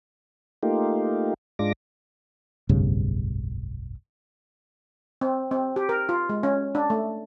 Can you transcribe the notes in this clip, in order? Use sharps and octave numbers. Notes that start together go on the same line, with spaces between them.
A3 A#3 D#4 F4 G4
G#2 G#3 D4 F4 D6 A#6
F1 B1 G2 C#3
C4
C4
G4
A#4
F4
G#3
C#4
D4
A3